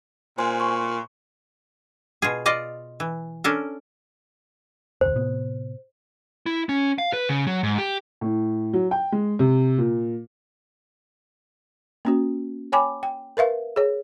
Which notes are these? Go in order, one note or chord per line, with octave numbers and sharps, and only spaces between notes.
A#2 C5 G#5 C6
C#6
B2 F4 G#4
F4 D5 D#5
E3
C#4 D4 A4 A#4
F1 D2 C5
A2 C3 B3
E4
C#4
F5
B4
C#3
F#3
G#2
G4
A2
F#3
G5
G#3
C3
A#2
A#3 C#4 F#4
C#5 G5 G#5 B5 D6
G5
A#4 B4 E5 F5
G#4 C#5